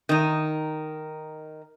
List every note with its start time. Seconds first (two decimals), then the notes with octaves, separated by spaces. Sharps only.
0.09 D#3 D#4